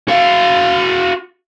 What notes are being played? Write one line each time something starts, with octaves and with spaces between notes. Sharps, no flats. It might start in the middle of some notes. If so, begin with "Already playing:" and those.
F#4 F5